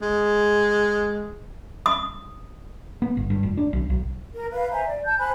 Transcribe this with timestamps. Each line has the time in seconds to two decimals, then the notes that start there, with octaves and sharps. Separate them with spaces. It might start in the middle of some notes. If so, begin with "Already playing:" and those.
0.02 G#3
1.86 D#6
3.02 B3
3.17 G1
3.30 G2
3.43 F1
3.57 D4
3.73 B1
3.90 B1
4.34 A#4
4.51 B4 F5
4.70 C5 E5 G#5 A#5
4.86 D5
5.06 A5 G6
5.19 C5 G#5 B5 F#6